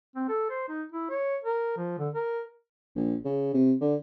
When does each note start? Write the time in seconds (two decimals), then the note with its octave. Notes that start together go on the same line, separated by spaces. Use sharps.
0.15 C4
0.29 A4
0.50 C5
0.69 D#4
0.92 E4
1.10 C#5
1.44 A#4
1.77 F3
1.99 D3
2.14 A#4
2.95 A#1
3.25 C#3
3.54 C3
3.81 D3